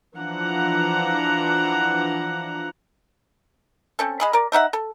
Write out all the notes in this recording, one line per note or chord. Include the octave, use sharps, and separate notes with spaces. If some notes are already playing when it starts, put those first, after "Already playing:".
E3 F3 D4 F#5 A#5
C4 C#4 A4
G#3 G#4 B5
A#4 D5
A3 D#4 E5 F#5
A4